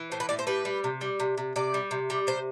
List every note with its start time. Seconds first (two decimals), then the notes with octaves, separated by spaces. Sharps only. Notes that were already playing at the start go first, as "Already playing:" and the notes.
Already playing: E3
0.12 A2 C5
0.20 B4
0.29 A2 D5
0.39 C5
0.47 G3 B4
0.65 G3
0.84 C3
1.01 G3
1.20 C3
1.38 C3
1.56 C3 D5
1.74 G3
1.91 C3
2.10 G3
2.27 C3 C5